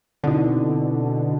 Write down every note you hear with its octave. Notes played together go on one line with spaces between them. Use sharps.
B2 D3 C4 D#4 E4